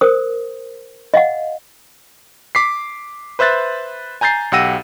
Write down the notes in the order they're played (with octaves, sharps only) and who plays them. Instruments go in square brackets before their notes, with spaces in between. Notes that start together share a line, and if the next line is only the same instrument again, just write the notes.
[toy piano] A#4 C5 D#6
D#5 F5 F#5
[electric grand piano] D6 B6 C7
B4 C5 E5 F#6 A6
G#5 A#5 G6 A6 C7
B1 G4 F#5 E6 A#6 D#7